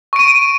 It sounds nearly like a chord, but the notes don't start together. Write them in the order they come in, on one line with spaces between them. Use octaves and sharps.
C#6 D7 D#7